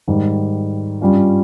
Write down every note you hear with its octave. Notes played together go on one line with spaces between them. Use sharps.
G#2 D#3 G3
G2 G3 C#4 F4